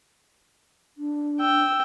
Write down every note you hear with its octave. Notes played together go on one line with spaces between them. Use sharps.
D4
G5 E6